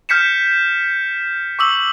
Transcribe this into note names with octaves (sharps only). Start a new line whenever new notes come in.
F6 G6 B6 C#7 E7
C#6 D6 E6 F#7